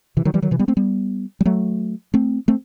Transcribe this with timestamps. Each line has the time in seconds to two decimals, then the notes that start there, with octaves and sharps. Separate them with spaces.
0.17 C3 E3
0.25 D#3 F#3
0.34 E3 G3
0.42 D#3 F#3
0.51 C3 E3
0.59 G3 B3
0.68 A3 C4
0.77 G3 B3
1.41 G3
1.45 F#3 A3
2.14 A3 C4
2.48 A3 C4